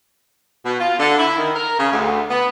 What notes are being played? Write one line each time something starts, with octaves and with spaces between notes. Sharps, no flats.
B2
F4
D3
E4
D#3
A#4
C#3
D2
B3